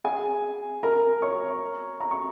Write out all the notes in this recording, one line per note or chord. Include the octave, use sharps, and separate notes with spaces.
G#4 G#5
A#4 A#5
C#5 C#6
A#5
C#6